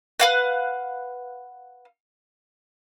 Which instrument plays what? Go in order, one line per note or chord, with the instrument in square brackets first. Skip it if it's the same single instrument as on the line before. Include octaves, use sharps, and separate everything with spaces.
[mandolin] B4 F5 F#5